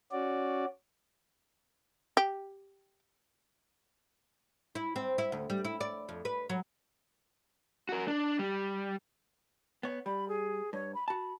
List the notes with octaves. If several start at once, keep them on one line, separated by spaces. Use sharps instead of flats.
C#4 F#4 D5
G4
E4
C4
E4
D2
G3
E4
D5
F2
B4
F#3
F#4 A#4
D4
G3
B3 C#5
G3 B5
G#4
G2 C#5
B5
F#4 A5 B5